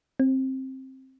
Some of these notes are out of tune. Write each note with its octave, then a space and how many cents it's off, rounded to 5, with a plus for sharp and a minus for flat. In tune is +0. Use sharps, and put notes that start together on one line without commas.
C4 +15